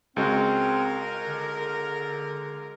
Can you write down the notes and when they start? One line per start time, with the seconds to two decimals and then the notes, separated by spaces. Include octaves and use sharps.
0.16 C#2 G#3 C4 F#4 A#4
1.25 D3